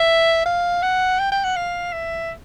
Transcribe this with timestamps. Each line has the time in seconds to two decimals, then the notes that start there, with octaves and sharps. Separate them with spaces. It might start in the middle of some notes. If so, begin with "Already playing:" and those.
Already playing: E5
0.46 F5
0.82 F#5
1.20 G5
1.32 G5
1.44 F#5
1.56 F5
1.93 E5